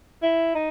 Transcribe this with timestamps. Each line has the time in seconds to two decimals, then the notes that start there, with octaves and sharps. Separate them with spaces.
0.22 E4
0.55 D#4